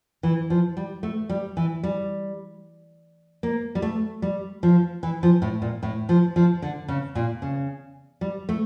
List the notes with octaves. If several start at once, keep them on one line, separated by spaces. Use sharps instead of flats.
E3
F3
G3
A3
G3
E3
G3
A#3
G3
A3
G3
F3
E3
F3
A2
A#2
A2
F3
F3
D3
C#3
A#2
C#3
G3
A3